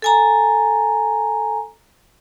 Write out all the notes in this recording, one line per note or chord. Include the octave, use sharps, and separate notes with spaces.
A4 G#5 A#5